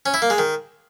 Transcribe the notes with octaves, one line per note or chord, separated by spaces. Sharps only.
C#4
E4
A#3
G#3
D#3